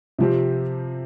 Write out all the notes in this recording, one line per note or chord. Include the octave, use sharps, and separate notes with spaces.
C3 F3 C4 G4